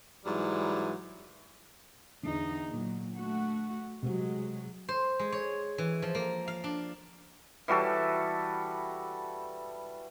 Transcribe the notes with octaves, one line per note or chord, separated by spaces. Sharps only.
G#2 E3 F#3 G3
E2 D3 D#4
A#2 F#3
A3 F#4
C3 F#3 G#3 C4 F#4
C5
G#3
C#5
E3
F3
A#3
F5
D4
E3 G3 F#4 A4